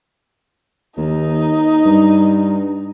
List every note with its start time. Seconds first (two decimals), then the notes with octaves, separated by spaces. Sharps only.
0.98 D#2 D#4
1.85 G2